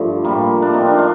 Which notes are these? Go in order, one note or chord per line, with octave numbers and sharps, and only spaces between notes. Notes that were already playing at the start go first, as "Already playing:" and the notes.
Already playing: G2 F3 A3
A2 F3 G3 A#3
A#3 D4
C4 D#4
D4 F4
D4 F4